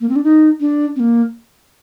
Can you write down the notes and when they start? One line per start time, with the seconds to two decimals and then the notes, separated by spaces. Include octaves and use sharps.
0.01 A#3
0.09 C4
0.16 D4
0.24 D#4
0.60 D4
0.96 C4
1.00 A#3